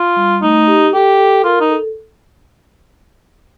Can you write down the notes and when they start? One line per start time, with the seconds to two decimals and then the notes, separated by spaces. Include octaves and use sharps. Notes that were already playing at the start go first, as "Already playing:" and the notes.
Already playing: F4
0.16 G3
0.42 A3 D#4
0.67 G4
0.93 G4 A4
1.18 A4
1.44 F4 A#4
1.61 D#4
1.70 A4